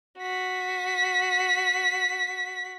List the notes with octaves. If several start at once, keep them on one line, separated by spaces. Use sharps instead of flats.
F#4 B6